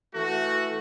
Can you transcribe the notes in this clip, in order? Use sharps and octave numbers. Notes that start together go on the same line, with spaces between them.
E3 A3 F#4